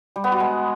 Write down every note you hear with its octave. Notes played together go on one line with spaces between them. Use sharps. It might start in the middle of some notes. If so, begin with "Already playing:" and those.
G3
B3
F#4
G#3